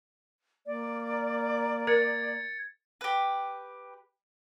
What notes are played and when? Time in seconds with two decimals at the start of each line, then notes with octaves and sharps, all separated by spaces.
0.67 A#3 D5
1.87 A#4 G#6 A6 C#7
3.01 G4 B4